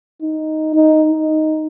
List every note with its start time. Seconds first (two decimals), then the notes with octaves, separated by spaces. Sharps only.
0.22 D#4
0.75 D#4
1.12 D#4